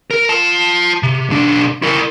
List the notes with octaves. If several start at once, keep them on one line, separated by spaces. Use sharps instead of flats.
A#4
F4 A5
C3
B1 D4
E4 A#4